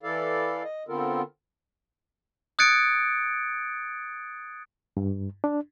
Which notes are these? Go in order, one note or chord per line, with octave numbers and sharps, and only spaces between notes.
E3 E4 A4 D5 F5
D#5
D3 B3 C4 F4 A4 A#4
D#6 F#6 G#6 A6 C#7 D7
G2
D4